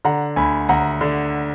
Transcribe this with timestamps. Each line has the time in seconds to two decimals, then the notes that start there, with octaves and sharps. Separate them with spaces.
0.05 D3 F#5 A#5
0.36 D2 G#5 B5
0.69 D2 F#5 A#5
1.01 D3